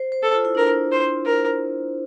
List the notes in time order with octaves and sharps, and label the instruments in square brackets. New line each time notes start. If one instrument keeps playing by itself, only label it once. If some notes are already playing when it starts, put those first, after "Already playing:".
Already playing: [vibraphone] C5
C5
[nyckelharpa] A4
[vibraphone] F4
E4
[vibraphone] D4 [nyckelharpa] A#4
[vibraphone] E4
[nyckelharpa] C5
A#4